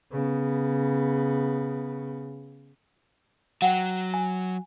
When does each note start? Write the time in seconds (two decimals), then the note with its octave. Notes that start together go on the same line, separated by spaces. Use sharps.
0.11 C#3 B3
3.62 F#3 F#5 G5
4.14 G#5